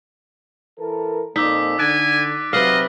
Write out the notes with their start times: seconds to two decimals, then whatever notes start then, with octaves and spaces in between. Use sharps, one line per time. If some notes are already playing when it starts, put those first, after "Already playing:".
0.78 E3 A4 A#4
1.36 F2 A#2 D#4 D6 E6 B6
1.79 D3 G#5 F#6 A6 D7
2.53 C3 F#3 B4 D#5 F5 F6 F#7 G7